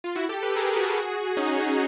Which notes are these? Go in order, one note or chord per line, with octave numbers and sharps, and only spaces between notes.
F4
E4 F#4
G4 A4
A4 B4
G#4 A#4
G4 A4
F#4 G#4
F#4 G#4
C#4 D#4